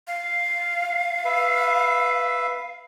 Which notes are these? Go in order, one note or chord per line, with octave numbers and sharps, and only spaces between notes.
F5
B4 E5